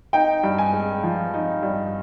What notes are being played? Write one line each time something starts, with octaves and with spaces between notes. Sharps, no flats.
D#4 G5
G2
G#5
G#3
F3
D#4
G2